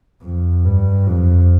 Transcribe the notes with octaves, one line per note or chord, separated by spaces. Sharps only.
F2
G2
F2